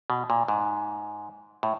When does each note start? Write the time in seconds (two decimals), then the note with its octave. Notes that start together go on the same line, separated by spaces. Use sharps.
0.10 B2
0.30 A#2
0.48 G#2
1.63 A2